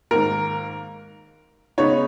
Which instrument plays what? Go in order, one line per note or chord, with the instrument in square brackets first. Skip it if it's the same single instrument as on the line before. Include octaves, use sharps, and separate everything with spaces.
[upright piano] G#2 D#3 A#3 A#4
C#3 G#3 B3 D#4 C#5